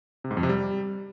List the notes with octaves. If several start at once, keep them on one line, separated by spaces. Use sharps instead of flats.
C3
G#2
F2
C3
G3